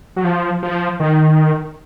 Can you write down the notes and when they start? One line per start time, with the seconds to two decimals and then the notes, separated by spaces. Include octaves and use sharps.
0.16 F#3
0.24 F3
0.63 F3
1.00 D#3